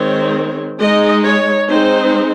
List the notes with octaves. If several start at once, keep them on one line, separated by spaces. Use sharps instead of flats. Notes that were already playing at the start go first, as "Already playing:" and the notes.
Already playing: D#3 G#3 C4 C#5
G#3 D#4 D#5
C#5
G#3 C4 D#4 C5